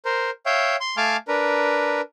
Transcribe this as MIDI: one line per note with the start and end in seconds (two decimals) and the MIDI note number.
0.05 0.30 70
0.05 0.30 72
0.46 0.76 73
0.46 0.76 76
0.46 0.76 77
0.46 0.76 79
0.81 0.96 84
0.97 1.17 57
0.97 1.17 77
0.97 1.17 80
0.97 1.17 81
0.97 1.17 86
0.97 1.17 89
1.28 2.01 62
1.28 2.01 70
1.28 2.01 71